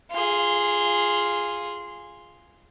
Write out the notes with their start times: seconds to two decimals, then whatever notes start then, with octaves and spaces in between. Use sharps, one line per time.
0.12 F4 G#4